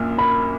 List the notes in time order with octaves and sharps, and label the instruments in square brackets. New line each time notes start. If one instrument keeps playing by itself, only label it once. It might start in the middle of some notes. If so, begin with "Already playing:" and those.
Already playing: [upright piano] A#1 F#2 A#2
[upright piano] A#3 [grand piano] B5